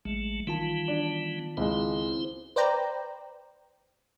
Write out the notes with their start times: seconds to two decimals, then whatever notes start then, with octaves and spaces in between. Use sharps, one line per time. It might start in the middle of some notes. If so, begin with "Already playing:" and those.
0.05 A1 F#3 G#3 A3
0.47 D#3 E3 G3 B3 F4 A5
0.88 D4
1.57 C#2 G#3 C4 E4 C5
2.56 B4 C5 D5 G5 A#5